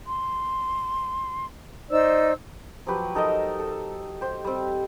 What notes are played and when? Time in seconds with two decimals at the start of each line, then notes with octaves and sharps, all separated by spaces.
0.06 C6
1.89 D#4 C5 D5 E6
2.87 F3 F#3 G4 B4
3.15 D#4 A4 A#4 D#5
3.60 A4
4.21 G4 C5
4.44 G3 C4